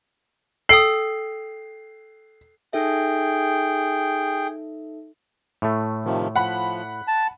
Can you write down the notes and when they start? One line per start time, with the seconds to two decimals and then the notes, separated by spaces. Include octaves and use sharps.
0.69 A4 G5 D#6 C7
2.73 D#4 G#4 A4 E5 G5
5.62 A2 A3
6.05 C3 D#3 F3
6.36 F3 F#5 B5
7.08 A5